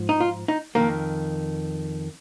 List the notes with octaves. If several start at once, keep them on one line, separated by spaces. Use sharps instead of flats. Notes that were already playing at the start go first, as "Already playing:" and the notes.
Already playing: G#2 F3
D#4
F4
D#4
F2 D#3 A#3